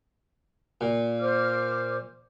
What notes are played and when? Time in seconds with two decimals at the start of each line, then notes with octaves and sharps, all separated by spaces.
0.81 A#2
1.20 C5 D6 F6